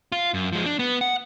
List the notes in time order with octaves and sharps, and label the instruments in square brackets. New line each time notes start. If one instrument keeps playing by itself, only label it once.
[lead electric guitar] F4
F#2
F3 G#3
D4
B3
F#5